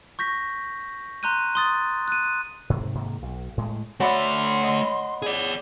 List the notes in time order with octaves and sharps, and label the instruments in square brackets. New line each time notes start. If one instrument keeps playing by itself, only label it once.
[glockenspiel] C#6 G6 A#6 B6
A#5 C6 F#6 G6 D#7
C6 D#6 A6
F#6 D#7
[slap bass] G#2 C3
G#2 C3 D#3 A#3
B1
A2 G#3 A3
[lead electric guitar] A3 D5 [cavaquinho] F#4 E5 [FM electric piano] C#5 F#5 B5 [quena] C6
[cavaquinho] D#5
[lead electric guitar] G#4 D5